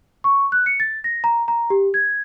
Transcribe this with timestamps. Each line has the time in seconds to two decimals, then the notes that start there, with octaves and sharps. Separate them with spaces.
0.24 C#6
0.52 F#6
0.66 C#7
0.80 A6
1.04 A#6
1.24 A#5
1.48 A#5
1.70 G4
1.94 G#6